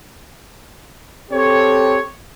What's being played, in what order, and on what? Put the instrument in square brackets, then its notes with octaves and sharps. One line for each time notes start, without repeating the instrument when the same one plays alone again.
[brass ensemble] C4 G4 A4 C#5